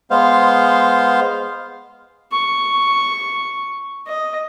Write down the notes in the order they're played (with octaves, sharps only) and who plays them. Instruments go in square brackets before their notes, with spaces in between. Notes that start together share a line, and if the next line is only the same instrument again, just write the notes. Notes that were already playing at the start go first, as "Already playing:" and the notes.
[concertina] G#3 B3 C5 F5
[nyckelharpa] C#6
D#5